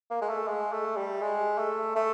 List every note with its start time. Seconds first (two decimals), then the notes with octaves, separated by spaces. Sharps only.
0.11 A#3
0.21 G#3
0.29 A3
0.48 G#3
0.72 A3
0.97 G3
1.22 G#3
1.58 A3
1.96 A3